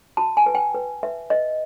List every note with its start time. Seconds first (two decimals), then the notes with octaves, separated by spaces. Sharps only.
0.17 F#4 A5
0.37 G#5
0.46 B4
0.55 G5
0.75 B4
1.03 B4 E5
1.30 B4 D#5